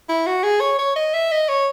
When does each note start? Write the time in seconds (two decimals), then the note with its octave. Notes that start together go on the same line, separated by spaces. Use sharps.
0.09 E4
0.26 F#4
0.44 G#4
0.61 C#5
0.79 C#5
0.96 D#5
1.14 E5
1.31 D#5
1.49 C#5